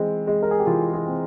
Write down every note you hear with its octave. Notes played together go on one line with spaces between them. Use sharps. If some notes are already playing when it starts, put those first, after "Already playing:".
Already playing: E3 G#3 C4
G#3
A#4
G#4
G4
E3 F4
F4 G#4
C4